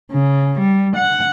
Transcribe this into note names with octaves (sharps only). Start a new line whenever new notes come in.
C#3
G3
F#5